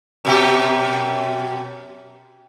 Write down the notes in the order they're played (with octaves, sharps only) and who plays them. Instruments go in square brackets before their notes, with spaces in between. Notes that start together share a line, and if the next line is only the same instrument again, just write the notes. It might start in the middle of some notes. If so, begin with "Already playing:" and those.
[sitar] F#2 B2 G4